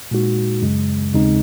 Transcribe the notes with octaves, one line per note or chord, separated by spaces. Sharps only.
A#2 G#3 D#4 F#4
F#2 C#3 G#3
D#2 C#3 G#3 C4 D#4